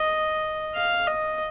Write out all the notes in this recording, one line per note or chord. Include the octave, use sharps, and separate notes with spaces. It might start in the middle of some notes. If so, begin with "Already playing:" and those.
Already playing: D#5
F5
D#5